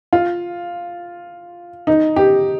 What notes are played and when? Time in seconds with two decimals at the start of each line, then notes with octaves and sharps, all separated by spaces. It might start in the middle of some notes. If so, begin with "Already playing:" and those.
0.13 F4
1.87 D#4
2.16 G4